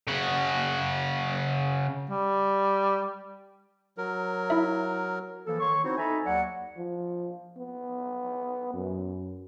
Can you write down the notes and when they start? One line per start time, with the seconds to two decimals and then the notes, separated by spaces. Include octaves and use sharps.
0.08 C#3 F#4
2.10 G3
3.98 F#3 A#4
4.50 E4 E5
5.46 E3 F3 A#3 A4
5.60 D#3 C#5 C6 C#6
5.83 B3 C4 D#4 E4 F#4 C5
5.98 D#4 A4 E5 G#5 A#5 B5
6.25 D#2 F#3 C#5 D5 F#5
6.77 F3
7.58 B3
8.74 F#2